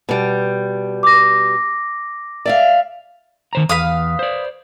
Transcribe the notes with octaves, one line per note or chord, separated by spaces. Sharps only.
B2 G3
D6 A#6
D5 E5 F5
D#3 C5 A#5
E2 B4 F5 D#6
C5 D5